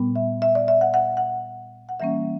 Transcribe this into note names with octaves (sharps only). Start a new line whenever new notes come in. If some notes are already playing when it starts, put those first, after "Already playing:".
Already playing: A#2 G3 B3
E5
E5
D5
E5
F#5
F#5
F#5
F#5
E3 G3 A#3 C#4 E5